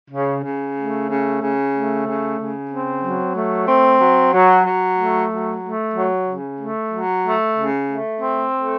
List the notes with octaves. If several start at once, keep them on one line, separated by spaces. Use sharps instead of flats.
C#3
C#3
A3
C#3
C#3
A3
C#3
C#3
C4
F#3
A3
C4
F#3
F#3
F#3
A3
F#3
A3
F#3
C#3
A3
F#3
A3
C#3
A3
C4
A3